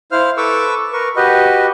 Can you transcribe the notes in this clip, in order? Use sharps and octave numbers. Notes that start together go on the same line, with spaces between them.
E4 C5 F5 F6
A4 B4 C#6 D6 E6
A#4 B4 C#6
F#4 G4 B4 D#5